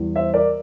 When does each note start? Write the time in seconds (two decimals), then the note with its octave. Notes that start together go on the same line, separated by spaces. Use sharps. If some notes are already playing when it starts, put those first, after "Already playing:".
Already playing: E2 E3 G3
0.16 C5 E5
0.34 A#4 D5